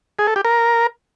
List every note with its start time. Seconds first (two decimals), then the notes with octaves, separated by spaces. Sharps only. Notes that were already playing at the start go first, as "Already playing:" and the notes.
0.19 G#4
0.27 A4
0.36 G4
0.45 A#4